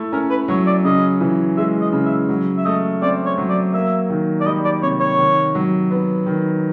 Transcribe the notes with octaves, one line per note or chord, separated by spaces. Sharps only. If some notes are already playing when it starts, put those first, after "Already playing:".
Already playing: A3 E4
C#4 A#4
B4
F#3 C#5
D5
C#3 D#5
E3
G#3 E5
D#5
C#3
E5
F#3
E5
A3 D#5
C4 D5
C#5
F#3
D5
A#3 E5
D#3
D5
G3 D#5
D5
C3 C#5
C#5
D#3
F#3
B3
D#3